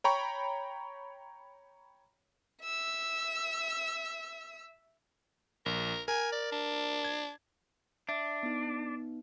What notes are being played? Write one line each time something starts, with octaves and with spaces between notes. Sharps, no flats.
C#5 G5 A#5 B5 C#6
E5 E6
A#1 A#4
A#4 G#5
D5
D4
G#6
D4 E5
B3 D#4